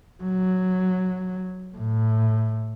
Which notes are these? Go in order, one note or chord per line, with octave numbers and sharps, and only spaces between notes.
F#3
A2